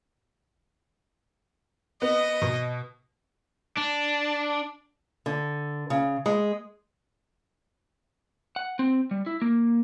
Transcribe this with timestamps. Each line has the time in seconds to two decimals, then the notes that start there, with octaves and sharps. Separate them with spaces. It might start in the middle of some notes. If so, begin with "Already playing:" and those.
2.02 B3 D#5
2.42 B2
3.78 D4
5.26 D3
5.90 C#3
6.26 G#3
8.56 F#5
8.79 C4
9.11 G3
9.26 E4
9.42 A#3